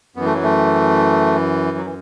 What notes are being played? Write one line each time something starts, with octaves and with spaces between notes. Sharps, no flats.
F#2 E3 B3
A3
F#3
A3
F#3
E3